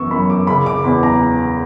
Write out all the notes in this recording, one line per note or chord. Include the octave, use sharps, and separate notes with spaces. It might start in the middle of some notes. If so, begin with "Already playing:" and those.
Already playing: F#2 E3 B3 C#6 E6
F#2 B5
D6
C#3 B5
D6
E2 B5
A#5